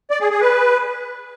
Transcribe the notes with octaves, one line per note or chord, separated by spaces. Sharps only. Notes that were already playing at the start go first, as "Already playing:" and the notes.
D5
G#4
G#4
B4